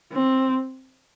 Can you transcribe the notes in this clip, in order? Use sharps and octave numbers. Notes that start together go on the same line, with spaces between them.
C4